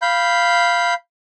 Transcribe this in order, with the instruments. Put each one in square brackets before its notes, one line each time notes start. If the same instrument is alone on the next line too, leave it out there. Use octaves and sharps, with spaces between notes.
[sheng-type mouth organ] F5 B5 G6